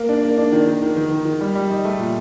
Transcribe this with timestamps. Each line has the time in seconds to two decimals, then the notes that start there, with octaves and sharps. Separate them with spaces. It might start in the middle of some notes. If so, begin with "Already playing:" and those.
Already playing: A#3
0.09 D4
0.23 A#3
0.38 D4
0.52 D#3
0.67 D#3
0.82 D#3
0.96 D#3
1.11 D#3
1.25 D#3
1.41 G3
1.55 G3
1.70 D#4
1.85 A3
1.99 A#2